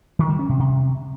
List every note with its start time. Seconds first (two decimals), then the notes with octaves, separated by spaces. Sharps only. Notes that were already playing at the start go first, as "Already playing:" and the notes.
0.19 D#3
0.29 G3
0.39 C#4
0.49 C3
0.59 C3